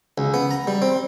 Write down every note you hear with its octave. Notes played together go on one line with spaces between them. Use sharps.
C#2
B3
A#5
G3
C4